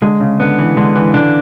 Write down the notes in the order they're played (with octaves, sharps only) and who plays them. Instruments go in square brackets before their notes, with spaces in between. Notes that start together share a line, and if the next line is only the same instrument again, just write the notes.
[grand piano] D3 [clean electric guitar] G#3
[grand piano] C#3
[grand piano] D3 [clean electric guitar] B3
[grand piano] E3
[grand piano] D3 [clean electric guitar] G#3
[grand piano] E3
[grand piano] D3 [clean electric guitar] D4